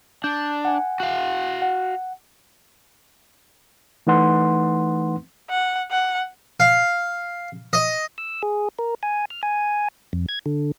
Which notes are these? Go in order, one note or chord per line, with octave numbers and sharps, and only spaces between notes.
D4 G6
F#5 G#5
F#4 F5
F#5
E3 A3 D#4 B4 F#5 C6
F#5
F#5
F5
D#5
E6
G#4
A#4
G#5
F6
G#5
F2
G#6
D3